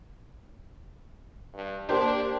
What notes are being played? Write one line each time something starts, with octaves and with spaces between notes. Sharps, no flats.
G2
A#3 D4 G4 C5